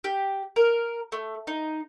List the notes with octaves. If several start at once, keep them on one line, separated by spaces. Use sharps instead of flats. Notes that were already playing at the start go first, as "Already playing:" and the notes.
G4
A#4
A3
D#4